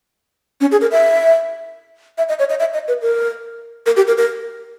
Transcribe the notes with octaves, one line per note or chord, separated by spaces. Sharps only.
C#4
G#4
A#4
E5
E5
D#5
C#5
D#5
E5
D#5
B4
A#4
A#4
G4
A#4
A#4